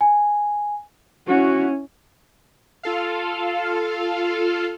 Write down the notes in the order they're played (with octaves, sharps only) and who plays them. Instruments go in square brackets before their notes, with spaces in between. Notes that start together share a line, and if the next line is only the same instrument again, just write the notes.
[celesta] G#5
[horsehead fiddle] C#4 E4 [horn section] F#4
[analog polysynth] F4 A4 F5